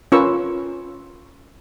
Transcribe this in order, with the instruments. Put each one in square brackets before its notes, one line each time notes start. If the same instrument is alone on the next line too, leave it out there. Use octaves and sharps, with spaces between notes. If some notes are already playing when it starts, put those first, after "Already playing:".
[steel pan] C#4 F4 A#4 B4 C#6 E6